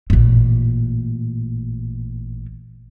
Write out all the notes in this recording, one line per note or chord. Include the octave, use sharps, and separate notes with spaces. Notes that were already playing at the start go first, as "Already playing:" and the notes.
A1 A#2